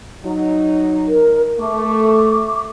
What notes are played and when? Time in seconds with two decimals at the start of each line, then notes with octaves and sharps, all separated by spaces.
0.25 F#3 D#4
1.09 A#4
1.59 A3 C#6 D6